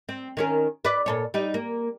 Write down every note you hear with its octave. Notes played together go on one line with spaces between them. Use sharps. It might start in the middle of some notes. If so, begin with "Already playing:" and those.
C4
D#3 C#4 A#4
B4 D5
A#2 A4 C#5
G3 D#4
A#3